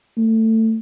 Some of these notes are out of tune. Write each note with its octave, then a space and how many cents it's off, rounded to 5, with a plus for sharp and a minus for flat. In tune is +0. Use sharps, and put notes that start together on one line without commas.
A3 +20